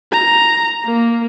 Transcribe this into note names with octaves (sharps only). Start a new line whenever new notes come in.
A#5
A#3